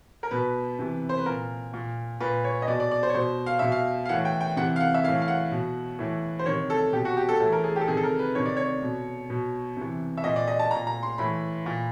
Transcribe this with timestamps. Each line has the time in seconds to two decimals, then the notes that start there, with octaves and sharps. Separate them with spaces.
0.23 A#4
0.31 B2 B4
0.79 C3 E3
1.09 C5
1.18 B4
1.26 A#2 A#4
1.73 A#2
2.20 A#2 B4
2.44 C#5
2.62 D#5
2.68 B2 D5
2.80 D5
2.91 D5
3.03 C5
3.09 C#5
3.15 B2 C5
3.46 F5
3.59 B2 E5
3.72 F5
4.05 F5
4.09 A2 E3 F#5
4.25 G5
4.41 G5
4.56 C3 E3 F#5
4.76 F5
4.80 F#5
4.94 E5
5.04 A2 E3 F5
5.22 F5
5.28 F#5
5.51 B2
5.99 A2 E3
6.39 C5
6.46 C3 D#3 C#5
6.70 A4
6.93 B2 G4
7.05 F#4
7.17 G4
7.29 A4
7.40 A2 E3 A4
7.52 A#4
7.64 G#4
7.76 G4
7.81 A4
7.88 C3 D#3 G#4
7.97 A4
8.03 A#4
8.19 B4
8.35 C3 D#3 C#5
8.46 D5
8.56 C#5
8.82 B2
9.30 B2
9.77 C3 E3
10.17 E5
10.24 A#2 D#5
10.36 D5
10.48 D#5
10.59 A5
10.71 A#2 A#5
10.87 A#5
11.03 C6
11.18 A2 E3 B5
11.66 A#2